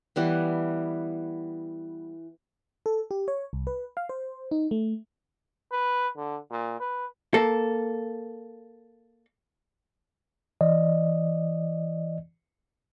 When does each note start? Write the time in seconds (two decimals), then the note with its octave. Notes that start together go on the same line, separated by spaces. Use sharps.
0.16 E3 G3 B3
2.86 A4
3.11 G4
3.28 C#5
3.53 C2
3.67 B4
3.97 F5
4.09 C5
4.51 D#4
4.71 A3
5.72 B4
6.17 D3
6.51 A#2
6.80 B4
7.34 A#3 A4
10.61 E3 D5 D#5